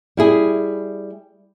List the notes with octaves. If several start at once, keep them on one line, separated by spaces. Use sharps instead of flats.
G3 E4 G#4